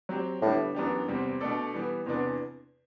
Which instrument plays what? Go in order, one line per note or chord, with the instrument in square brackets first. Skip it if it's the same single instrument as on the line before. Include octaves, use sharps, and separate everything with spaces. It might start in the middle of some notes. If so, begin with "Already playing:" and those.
[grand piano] F#3 C4 G4
[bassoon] A2 [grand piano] D3 G3 B3 D4
[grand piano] F#2 E3 B3 D4 G4
E2 C3 G3 C4
B2 A3 D4 A4 D5
E3 G3 B3
E2 C3 E3 B3 D4